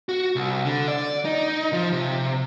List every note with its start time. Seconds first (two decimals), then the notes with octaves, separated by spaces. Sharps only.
0.09 F#4
0.36 C2
0.65 D3
0.88 D5
1.25 D#4
1.73 F3
1.93 C3